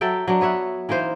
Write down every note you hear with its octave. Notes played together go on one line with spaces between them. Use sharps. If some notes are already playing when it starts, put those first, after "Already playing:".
F#3 A4 E5 G5
F#3 D4
B3 C#5 E5 F#5
E3 A#3 D#4 C5